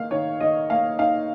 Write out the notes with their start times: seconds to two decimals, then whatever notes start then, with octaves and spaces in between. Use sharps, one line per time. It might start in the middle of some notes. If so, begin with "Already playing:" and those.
Already playing: D#3 A#3 D#4 F5
0.11 D#3 C#5
0.40 D#3 D#5
0.70 A#3 F5
0.99 D#4 F5